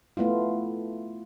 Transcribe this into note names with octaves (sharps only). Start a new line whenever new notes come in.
A3 B3 E4 F4